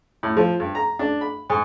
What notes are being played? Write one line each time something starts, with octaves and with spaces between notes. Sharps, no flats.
A2
F3
G2
A#5
D4
B5
G#2